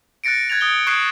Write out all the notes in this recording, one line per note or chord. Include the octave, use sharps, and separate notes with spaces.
F#6 A6 A#6 C#7 D7
F#6 G#6 A6 F7
D#6 F#6 G7
C#6 D#6 F#6 G#6 C7 E7